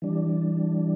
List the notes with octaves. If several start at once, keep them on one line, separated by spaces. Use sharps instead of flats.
E3 G3 D4